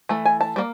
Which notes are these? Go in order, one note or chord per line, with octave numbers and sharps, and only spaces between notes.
E3 A3
G#5
A5
G3 A#3